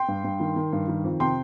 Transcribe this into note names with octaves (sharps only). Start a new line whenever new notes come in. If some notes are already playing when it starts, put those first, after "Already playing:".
Already playing: G5 C6
G2
G2
D#3
D#3
G2
D#3
F2
C3 G5 C6